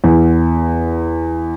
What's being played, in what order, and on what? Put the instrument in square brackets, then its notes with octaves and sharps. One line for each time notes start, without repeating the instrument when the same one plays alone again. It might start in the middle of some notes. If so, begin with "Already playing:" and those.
[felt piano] E2